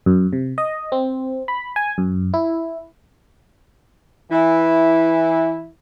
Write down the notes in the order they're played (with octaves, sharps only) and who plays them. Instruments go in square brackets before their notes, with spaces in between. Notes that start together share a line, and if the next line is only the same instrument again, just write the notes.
[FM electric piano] F#2
C3
D#5
C4
B5
G#5
F#2
E4
[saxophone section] E3 E4